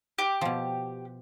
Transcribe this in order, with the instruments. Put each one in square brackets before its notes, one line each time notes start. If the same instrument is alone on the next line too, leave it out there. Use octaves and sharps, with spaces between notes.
[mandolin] G4
[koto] B2 F3